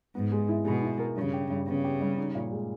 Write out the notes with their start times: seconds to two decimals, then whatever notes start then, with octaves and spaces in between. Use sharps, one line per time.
0.15 G#2 B3
0.32 G#3
0.49 E4
0.65 B2 G#3
0.83 E4
0.99 A#4
1.16 G2 C#3
1.33 G4
1.50 G2
1.67 C#3 B3
1.84 G4
2.01 G3
2.18 D#4
2.35 A#2
2.51 G#3